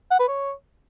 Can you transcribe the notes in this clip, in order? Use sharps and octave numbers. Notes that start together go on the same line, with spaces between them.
F#5
B4
C#5